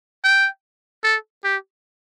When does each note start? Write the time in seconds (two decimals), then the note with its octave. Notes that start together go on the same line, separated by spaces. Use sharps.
0.24 G5
1.04 A4
1.44 G4